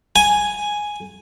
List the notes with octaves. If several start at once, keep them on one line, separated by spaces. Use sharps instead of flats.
G#5